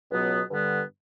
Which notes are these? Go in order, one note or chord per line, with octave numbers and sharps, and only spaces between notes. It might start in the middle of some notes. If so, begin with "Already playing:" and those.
C#2 B2 F#3 B3
G2 D3 G3 B3